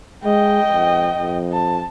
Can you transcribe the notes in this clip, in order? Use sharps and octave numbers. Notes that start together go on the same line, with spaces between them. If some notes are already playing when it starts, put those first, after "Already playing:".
G#3 D#5 G5
F2
F2
A5